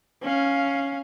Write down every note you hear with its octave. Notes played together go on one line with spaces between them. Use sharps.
C#4 F5